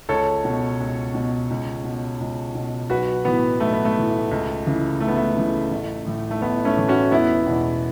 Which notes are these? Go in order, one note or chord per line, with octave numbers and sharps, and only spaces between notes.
C#2 A4 C#5
B2
C#2
B2
C#2
B2
C#2
B2
B1 F#4 B4
A2 E3 B3
B1 A3
B3
A3
A2 E3
C#2
C#3 E3
C#2 A3
B3
A3
C#3 E3
A1
A2 E3
A3
A1 B3
A3 C#4
A2 E3
C#4 F#4
E1 B3 E4
E2 B2